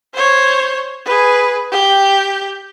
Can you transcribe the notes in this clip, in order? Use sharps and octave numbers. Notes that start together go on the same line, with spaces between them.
C5 C#5
G#4 B4
G4 G5